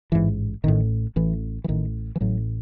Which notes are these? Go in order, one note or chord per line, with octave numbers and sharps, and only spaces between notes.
A1 G#2 E3
A1 A2 D#3
A1 A2 E3
E3
A1 A2 D#3
E3
A1 A2 F#3